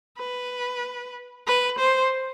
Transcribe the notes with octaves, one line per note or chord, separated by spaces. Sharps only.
B4
B4
C5